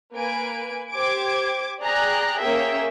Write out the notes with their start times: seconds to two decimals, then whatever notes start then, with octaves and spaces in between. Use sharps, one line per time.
0.14 A#3 B4 G#5 D7
0.92 G4 C5 D6 G#6 D7
1.80 G#4 D5 G5 A#5 F#6
2.40 A#3 C#4 G#4 A#4 E5 G5